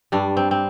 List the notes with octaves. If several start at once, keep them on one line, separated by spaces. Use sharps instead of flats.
G2 G3 D4
C4
C4